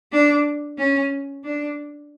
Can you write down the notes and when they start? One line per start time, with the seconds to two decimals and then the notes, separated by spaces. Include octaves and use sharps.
0.12 D4
0.78 C#4
1.44 D4